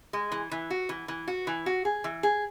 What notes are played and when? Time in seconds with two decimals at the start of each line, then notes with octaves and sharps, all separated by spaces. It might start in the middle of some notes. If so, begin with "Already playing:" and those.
0.13 G#3
0.32 E3
0.51 E3
0.70 F#4
0.89 E3
1.08 E3
1.28 F#4
1.47 E3
1.66 F#4
1.85 G#4
2.04 E3
2.23 G#4